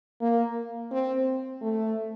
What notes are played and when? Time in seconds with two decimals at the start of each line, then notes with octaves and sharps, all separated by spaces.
0.21 A#3
0.91 C4
1.62 A3